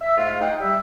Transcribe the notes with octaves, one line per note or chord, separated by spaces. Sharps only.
E5
G#2 A3 F4 F5
D#4 F#5 G5
G3 E5